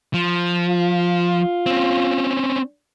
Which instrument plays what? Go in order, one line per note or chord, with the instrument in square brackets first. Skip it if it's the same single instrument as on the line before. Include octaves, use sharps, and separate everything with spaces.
[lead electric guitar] F3
[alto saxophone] F4
[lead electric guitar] C4 C#4